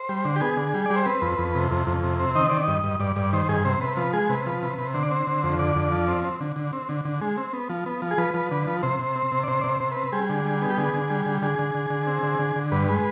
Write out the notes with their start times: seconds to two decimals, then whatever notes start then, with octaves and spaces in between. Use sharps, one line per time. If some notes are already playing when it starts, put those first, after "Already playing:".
Already playing: C5
0.09 G3
0.25 D3
0.36 G4
0.41 B3 G#4
0.57 D3
0.74 G3
0.86 G3 D5
0.96 C5
1.06 C4 B4
1.22 F2
1.38 F2
1.55 C3
1.71 F2
1.87 F2
2.03 C3
2.20 C4
2.35 D#3 D#5
2.50 D#3 D5
2.63 G2 D#5
2.84 G2
3.00 G2 D5
3.16 G2 D5
3.33 D#3 C5
3.49 G2 G#4
3.65 C3 C5
3.81 C3 B4
3.97 F3 B4
4.13 G#3 G#4
4.29 C3 B4
4.46 F3
4.62 C3
4.78 C3
4.94 D3 C5
5.03 D5
5.11 C4 C5
5.27 D3
5.44 F2
5.59 D3 D5
5.76 F2
5.92 F3
6.08 C4
6.24 C4
6.40 D3
6.56 D3
6.73 C4
6.89 D3
7.05 D3
7.21 G#3
7.37 C4
7.53 B3
7.69 F3
7.86 B3
8.02 F3
8.11 G#4
8.18 F3 B4
8.34 F3
8.51 D3
8.67 F3
8.83 C3 C5
8.99 C3
9.16 C4
9.32 C3
9.43 D5
9.48 C3 C5
9.61 C3 D5
9.69 C5
9.80 C3
9.91 B4
9.96 C4
10.12 G3 G#4
10.29 D3
10.45 G3
10.62 B3
10.70 G4
10.77 D3 G#4
10.93 D3
11.10 G3
11.26 D3
11.42 D3 G#4
11.59 D3
11.75 D3
11.90 D3
12.07 C4
12.23 D3
12.39 D3
12.56 D3
12.72 G2 B4
12.88 G#3